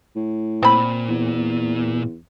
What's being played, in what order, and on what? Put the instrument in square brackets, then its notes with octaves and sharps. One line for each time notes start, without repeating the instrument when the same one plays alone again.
[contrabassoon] A2
[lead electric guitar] A#2 [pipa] C4 B5
[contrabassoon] E2